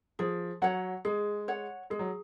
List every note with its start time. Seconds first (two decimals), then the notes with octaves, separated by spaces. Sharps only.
0.19 F3 G#4
0.62 F#3 C#5 F#5
1.05 G#3 G#4
1.48 C#5 F#5
1.90 G#3 G#4
1.99 F#3